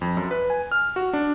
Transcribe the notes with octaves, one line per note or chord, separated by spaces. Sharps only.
F2
F#2
B4
G#5
F6
F#4
D4